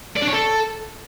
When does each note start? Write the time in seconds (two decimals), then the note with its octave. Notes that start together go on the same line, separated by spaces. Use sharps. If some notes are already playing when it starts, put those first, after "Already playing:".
0.17 D5
0.22 D4
0.27 C#5
0.33 A4